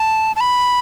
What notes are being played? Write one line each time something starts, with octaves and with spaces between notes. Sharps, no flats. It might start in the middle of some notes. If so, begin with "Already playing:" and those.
Already playing: A5
A5
B5